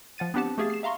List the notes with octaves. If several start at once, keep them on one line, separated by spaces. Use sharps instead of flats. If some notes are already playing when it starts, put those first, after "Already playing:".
F3 F#5 A6 D#7
B3 C4 D4 G4 F#5 A5
A3 G4 G#4 F5 A6
C7 E7
E5 F5 A#5 C6 C#6